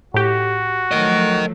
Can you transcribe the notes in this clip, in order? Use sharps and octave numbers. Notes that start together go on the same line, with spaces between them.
A2 F#4 G4
F3 F#3 A3 A#4 D#5